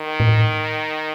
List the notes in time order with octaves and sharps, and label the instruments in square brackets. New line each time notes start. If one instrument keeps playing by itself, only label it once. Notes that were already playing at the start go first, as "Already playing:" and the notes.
Already playing: [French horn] D#3
[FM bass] A2